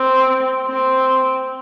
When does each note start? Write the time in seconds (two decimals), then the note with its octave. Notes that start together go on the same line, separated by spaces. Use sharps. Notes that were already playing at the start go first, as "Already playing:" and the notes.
Already playing: C4
0.68 C4